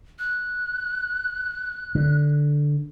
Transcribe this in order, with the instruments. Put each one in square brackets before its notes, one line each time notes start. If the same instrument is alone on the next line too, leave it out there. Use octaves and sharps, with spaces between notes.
[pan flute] F#6
[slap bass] D3